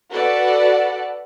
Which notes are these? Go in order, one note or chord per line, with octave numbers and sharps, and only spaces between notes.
F#4 A4 B4 D5 F#5